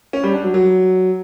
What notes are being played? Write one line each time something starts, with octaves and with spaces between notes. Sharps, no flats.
C#4
G3
D4
F#3
F#3